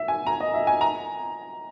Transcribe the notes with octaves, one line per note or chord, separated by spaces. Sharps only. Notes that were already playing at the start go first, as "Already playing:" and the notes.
Already playing: E5
G#5
A#5
D#5
E5
G#5
A#5